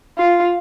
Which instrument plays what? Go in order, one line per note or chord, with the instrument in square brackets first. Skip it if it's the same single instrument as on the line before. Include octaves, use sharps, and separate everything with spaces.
[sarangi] F4